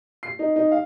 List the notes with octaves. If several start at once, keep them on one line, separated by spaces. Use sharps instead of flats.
C7
D#4
D#4
F5